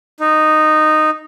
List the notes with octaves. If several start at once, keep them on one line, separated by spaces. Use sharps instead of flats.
D#4